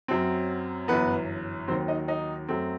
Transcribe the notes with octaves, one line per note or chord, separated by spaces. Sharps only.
F#2 F#3 C4
G1 F#2 E3 B3 B4
D#2 D#3 F#3 C4 C5
D#4 D#5
D#4 D#5
F#2 F#3 A3 C4